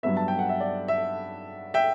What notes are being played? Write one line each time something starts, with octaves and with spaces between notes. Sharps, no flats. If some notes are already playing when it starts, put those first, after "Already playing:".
G2 F#3 B3 E5
A5
G5
F#5
E5
D5
E5
E5 G5